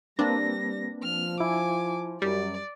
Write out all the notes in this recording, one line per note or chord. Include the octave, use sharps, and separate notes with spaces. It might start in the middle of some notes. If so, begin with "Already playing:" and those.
G3 A#3 C4 D4 B4 A#6
F3 F6
E4 G#5 D6
F#2 G3 D5